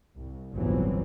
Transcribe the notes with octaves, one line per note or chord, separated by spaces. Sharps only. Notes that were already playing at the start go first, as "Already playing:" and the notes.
C2
G1 C#2 A2 E3 F#3 C4